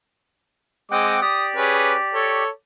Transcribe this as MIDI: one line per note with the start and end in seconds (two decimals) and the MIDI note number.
0.91 1.17 56
0.91 1.21 60
0.91 1.17 75
0.91 1.21 78
0.91 1.21 79
0.91 1.17 86
1.22 2.44 67
1.22 2.44 74
1.22 1.46 87
1.56 1.93 61
1.56 1.93 68
1.56 1.93 71
2.14 2.49 69
2.14 2.49 73